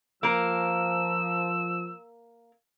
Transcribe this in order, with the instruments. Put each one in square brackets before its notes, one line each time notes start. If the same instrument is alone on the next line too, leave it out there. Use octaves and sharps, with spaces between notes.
[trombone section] F3 [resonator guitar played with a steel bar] A#3 A#4 [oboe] E6